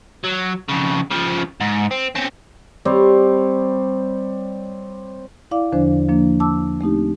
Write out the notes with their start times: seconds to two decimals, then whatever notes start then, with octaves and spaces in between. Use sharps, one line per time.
0.24 F#3
0.69 F2 C#3
1.11 C#3 F3
1.61 G#2
1.91 C4
2.15 C4 C#4
2.85 G3 C4 C#5
5.51 E4 D5 F5 D6
5.72 E2 D3 F3 D4 C5
6.09 F3 A#3 D4
6.40 A5 D6 E6
6.81 A3 C4 D#4 G4